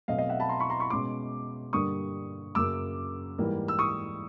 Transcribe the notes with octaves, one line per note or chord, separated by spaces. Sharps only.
B2 F#3 A3 C4 D#5 F5
D#5 F5
E5 F#5
A5 B5
A#5 C6
B5 C#6
A#5 C6
B5 C#6
B2 G#3 C#4 C6 D6
G2 D3 G3 A#3 C#6 D#6
F#2 C#3 F#3 A#3 D6 E6
G#2 E3 G3 A#3
E6
C#6 D#6